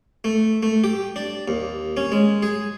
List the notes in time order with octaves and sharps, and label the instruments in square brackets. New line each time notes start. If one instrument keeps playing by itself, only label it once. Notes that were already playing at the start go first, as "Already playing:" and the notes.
[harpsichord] A3
A3
G4
D4
D#2
C#4
G#3
G#4